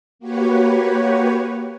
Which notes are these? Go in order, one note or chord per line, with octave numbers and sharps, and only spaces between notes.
A#3 F#4 G4 B4 C#5